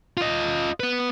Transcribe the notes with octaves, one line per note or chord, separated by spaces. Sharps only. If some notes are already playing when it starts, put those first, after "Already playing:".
F4 D#5
B3 B4